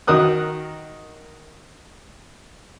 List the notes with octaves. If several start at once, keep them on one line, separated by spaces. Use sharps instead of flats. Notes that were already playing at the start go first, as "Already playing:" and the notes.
D#3 F#4 A#4 D#6 F#6